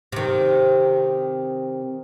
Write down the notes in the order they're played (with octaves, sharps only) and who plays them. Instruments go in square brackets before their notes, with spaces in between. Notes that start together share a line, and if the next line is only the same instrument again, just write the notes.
[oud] C3 D#3